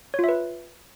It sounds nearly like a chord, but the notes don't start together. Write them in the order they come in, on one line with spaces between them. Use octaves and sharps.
C#5 F4 E5 B4